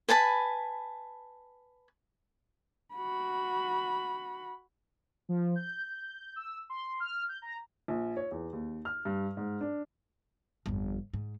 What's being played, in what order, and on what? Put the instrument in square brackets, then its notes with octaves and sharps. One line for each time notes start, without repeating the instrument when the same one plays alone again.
[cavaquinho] B4 G#5 A5 B5
[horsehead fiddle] F#4 B5
[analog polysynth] F3
G6
E6
C6
F6
G6
A#5
[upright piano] A#1
C#5
E2
D#2
F6
G2
G#2
D4
[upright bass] G1 F2
G#2